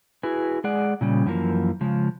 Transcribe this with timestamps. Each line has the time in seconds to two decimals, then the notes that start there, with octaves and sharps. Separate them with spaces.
0.23 E4 F#4 G#4 B4
0.64 G#3 G#4 D5 F#5
1.01 A#2 C#3 G3
1.26 F#2 E3 F3 A#3
1.81 C#3 F3 G#3